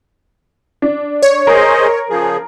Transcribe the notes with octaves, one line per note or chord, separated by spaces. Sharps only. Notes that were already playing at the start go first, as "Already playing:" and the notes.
D4
C#5
G#4 A#4 C5 D#5
C#3 F3 G#4